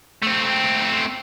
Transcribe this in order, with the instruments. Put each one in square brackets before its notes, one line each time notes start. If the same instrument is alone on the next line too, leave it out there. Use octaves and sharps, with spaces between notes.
[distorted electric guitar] A3 C4